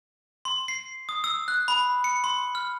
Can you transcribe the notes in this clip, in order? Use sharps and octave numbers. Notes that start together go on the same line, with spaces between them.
C6
C7
D#6
E6
F#6
B5
C#7
C6
F6